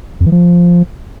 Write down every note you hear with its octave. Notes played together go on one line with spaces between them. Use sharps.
F2
E3
F3